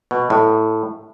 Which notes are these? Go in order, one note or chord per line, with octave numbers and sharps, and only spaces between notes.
B2
A2